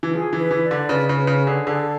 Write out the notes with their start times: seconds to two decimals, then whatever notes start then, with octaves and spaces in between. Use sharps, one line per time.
0.03 E3
0.13 F3 G#4
0.33 E3
0.39 B4
0.51 E3
0.64 D5
0.71 D3
0.89 C#3 B4
1.09 C#3
1.15 B4
1.27 C#3
1.41 G#4
1.47 D3
1.66 D3 A4